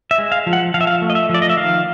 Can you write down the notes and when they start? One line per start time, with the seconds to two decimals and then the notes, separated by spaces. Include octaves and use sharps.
0.11 E5
0.18 G#3
0.32 F5
0.47 F3
0.53 F#5
0.74 F3 F5
0.81 E5
0.87 F5
1.02 A3
1.10 D#5
1.15 E5
1.29 F3 D5
1.42 D#5
1.49 E5
1.57 D#3 F5